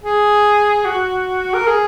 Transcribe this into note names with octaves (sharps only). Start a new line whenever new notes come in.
G#4
F#4
A#4
G#4